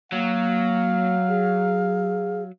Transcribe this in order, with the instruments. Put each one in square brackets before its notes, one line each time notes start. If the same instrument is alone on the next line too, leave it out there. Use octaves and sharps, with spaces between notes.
[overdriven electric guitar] F#3 [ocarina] A#3 [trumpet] F5
[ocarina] G#4